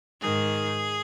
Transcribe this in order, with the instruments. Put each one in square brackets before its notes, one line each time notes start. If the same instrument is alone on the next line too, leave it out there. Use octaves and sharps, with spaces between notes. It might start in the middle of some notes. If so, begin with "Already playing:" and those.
[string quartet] G#2 D#3 G#4